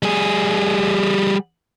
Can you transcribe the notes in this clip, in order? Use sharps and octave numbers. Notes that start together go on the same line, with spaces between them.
G3 G#4